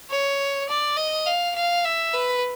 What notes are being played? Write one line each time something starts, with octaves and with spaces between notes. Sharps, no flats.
C#5
D5
D#5
F5
F5
E5
B4